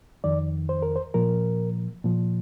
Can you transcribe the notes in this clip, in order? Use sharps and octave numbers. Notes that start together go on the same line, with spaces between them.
F2 D#3 D5
C5
A#4
C5
A#2 F3 A#4
A#2 F3